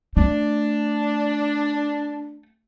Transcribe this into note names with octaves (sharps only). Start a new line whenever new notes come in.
A3 D4